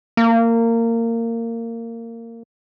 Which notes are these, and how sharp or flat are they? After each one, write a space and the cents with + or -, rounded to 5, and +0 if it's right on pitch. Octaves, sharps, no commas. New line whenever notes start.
A#3 -20